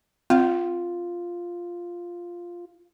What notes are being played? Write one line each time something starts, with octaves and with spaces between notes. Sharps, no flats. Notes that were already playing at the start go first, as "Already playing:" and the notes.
C4 F4